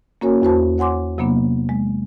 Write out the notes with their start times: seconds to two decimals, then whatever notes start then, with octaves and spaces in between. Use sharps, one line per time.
0.21 A#3 C#4 F#4 A#4 C#5 G#5
0.42 E2 F#4 C5 A5
0.78 C#5 F#5 G#5 C6 D6
1.18 C3 F#3 A#3 B3 D4
1.69 G#3